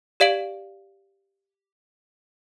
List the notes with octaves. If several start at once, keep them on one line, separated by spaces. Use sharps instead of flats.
G4 D5 F5 D7 F#7